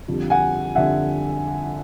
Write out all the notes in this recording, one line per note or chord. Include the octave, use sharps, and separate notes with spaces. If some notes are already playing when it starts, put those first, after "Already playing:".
F2 D3 G3
F#5 G#5
F2 D3 G3 E5 F#5